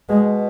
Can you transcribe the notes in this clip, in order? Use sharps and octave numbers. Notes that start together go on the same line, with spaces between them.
B2 G#3